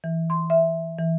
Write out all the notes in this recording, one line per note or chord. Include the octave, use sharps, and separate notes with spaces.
E3
C6
E5
E3